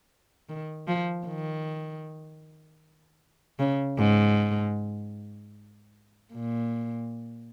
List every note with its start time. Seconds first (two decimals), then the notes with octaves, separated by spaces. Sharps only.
0.49 D#3
0.87 F3
1.27 D#3
3.59 C#3
3.98 G#2
6.32 A#2